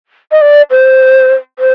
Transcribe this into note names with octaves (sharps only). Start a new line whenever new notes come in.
D#5
D5
C5
C5